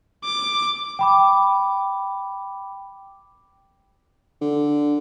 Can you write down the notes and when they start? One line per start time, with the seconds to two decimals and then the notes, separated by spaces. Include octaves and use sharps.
0.25 D6
0.99 G5 B5 D6
4.41 D3